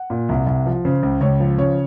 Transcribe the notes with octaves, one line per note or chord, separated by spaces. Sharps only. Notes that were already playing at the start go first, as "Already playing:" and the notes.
Already playing: F#5
A#2
C2
C2
F3
C#3 C5
C#2
C#2 C#5
F3
C#3 C#5